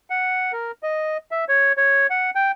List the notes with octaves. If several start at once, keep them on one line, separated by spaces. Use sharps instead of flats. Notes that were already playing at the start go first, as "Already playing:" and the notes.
F#5
A#4
D#5
E5
C#5
C#5
F#5
G5